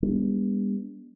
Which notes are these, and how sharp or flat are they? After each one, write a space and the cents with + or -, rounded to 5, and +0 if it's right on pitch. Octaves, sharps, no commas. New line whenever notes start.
G3 +35 B3 -20 D4 -30